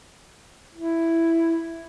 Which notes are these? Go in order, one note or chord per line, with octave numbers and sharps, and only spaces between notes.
E4